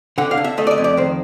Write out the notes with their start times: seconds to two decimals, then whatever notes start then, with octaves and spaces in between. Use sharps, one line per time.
0.18 D3 F#5
0.31 F5
0.37 D3
0.44 E5
0.58 A3 D#5
0.67 D5
0.71 D#5
0.78 F2
0.84 D5
0.97 D#3 C5